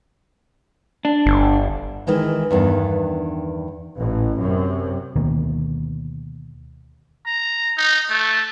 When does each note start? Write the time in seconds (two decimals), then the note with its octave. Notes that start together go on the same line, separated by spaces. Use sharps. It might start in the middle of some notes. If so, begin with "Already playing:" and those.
1.05 D4
1.26 G1
2.07 D#3 E3 G#3 D#4
2.51 E2 G2 D#3 B3 D4
3.99 A1
4.38 F#2 C3
5.16 D2 B2 D#3 A#3
7.26 A#5
7.78 D#4
8.10 A3